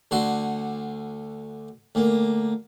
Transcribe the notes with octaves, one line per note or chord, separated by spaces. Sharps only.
D2 D3 F#4 C6
D2 A#3